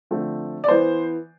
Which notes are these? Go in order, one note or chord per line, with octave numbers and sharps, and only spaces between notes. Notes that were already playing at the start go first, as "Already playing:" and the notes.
D3 F3 A3 C4
D5
E3 B3 C5